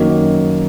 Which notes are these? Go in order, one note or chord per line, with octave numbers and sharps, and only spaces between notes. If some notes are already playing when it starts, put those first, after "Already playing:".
Already playing: F#2 D#3 A#3 D#4 F#4